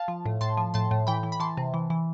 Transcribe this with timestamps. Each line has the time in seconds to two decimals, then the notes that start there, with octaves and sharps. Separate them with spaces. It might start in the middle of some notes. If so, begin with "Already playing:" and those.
Already playing: F5 A5
0.08 F3
0.26 A2
0.41 A2 A5 C6
0.57 F3
0.74 A2 A5 C6
0.91 A2
1.07 E3 G5 B5
1.23 E3
1.32 B5
1.40 E3 A5 C6
1.57 C3
1.74 E3
1.90 E3